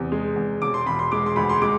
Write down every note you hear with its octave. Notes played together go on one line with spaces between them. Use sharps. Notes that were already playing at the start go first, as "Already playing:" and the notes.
Already playing: E2 C3
G#3
E2
E1 D6
C6
E1 B5
C6
G#3 D6
C6
D2 B5
C6
G#3 D6